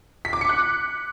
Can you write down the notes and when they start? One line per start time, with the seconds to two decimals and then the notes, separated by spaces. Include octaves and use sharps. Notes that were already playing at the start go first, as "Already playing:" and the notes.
0.25 B6
0.33 D6
0.41 C#7
0.49 F#6